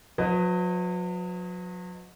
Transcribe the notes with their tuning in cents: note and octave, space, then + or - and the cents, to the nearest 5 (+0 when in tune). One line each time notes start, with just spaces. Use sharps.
F#3 -40 B4 +20 D#5 +0